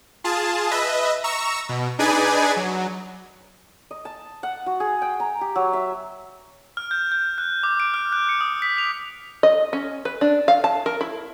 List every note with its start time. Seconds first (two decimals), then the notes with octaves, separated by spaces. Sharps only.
0.24 F4 G#4 A5
0.71 B4 D#5 E5
1.24 A#5 C#6 E6
1.69 B2
1.99 D4 D#4 G#4 B4 D5 G#5
2.56 F#3
3.91 D#5
4.05 A5
4.43 F#5
4.66 F#4
4.80 G#4
5.02 G5
5.20 A#5
5.41 G4
5.56 F#3
5.73 E5
6.77 F6
6.91 G6
7.12 G6
7.38 F#6
7.63 D6
7.80 D7
7.94 F6
8.12 F#6
8.29 C#7
8.41 D#6
8.62 B6
8.78 F7
9.43 D#5
9.73 C#4
10.05 B4
10.21 D4
10.48 F5
10.64 A5
10.86 A#4
11.01 E4